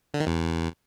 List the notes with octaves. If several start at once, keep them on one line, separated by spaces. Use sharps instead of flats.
D3
D#3
E2